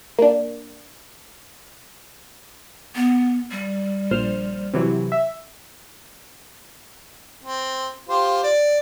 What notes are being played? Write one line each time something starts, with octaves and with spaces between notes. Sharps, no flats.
A#3 D4
B3
G3
A#1 C5 F6
C3 E3 F#3
E5
C4
F4 G4 C5
D5